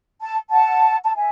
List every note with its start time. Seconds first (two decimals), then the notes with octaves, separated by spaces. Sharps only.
0.22 A5
0.50 F#5 A5
1.06 A5
1.16 E5 G#5